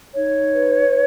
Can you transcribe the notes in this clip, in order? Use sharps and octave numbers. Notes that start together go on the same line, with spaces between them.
D#4 C#5
B4